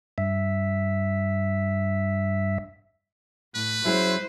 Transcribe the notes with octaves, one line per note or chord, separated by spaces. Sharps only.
G2 E5
A2 B4
F#3 C#4 E4 G#4 C5